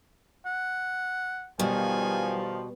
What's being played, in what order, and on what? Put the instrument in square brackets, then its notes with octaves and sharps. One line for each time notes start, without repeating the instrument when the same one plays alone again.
[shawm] F#5
[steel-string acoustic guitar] B2 [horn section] D#3 F3 [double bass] G3 [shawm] G#5